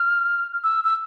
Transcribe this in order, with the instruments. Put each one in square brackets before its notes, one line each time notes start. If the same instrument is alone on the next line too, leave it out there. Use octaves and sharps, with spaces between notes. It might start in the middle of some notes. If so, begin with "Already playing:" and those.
Already playing: [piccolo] F6
E6
E6